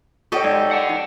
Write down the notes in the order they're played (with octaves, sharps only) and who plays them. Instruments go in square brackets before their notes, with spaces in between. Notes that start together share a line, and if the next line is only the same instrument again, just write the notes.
[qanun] G4 A4 D#5 [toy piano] C#5 G5 C#6
[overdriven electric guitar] G#2 [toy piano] D5
[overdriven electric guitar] F#5 A5
[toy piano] D#4